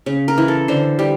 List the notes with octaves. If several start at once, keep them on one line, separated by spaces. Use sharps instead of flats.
C#3
A#4
E3
A4
D3 C5
G3